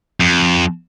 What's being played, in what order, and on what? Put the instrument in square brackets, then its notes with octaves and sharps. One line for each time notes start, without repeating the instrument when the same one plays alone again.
[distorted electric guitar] F2